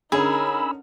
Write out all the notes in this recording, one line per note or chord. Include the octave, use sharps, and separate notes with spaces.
D3 C#4 D#4 G#4 A#4 B5 E6